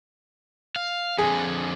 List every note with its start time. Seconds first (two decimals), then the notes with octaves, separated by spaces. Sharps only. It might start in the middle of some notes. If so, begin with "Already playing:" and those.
0.76 F5
1.18 F2 D3 G#4